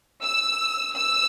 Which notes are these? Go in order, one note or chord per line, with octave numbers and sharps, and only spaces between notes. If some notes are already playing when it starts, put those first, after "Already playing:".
E6
E6